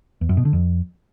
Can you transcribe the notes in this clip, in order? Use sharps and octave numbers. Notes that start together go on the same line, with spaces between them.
E2
F#2
B2
D3
F2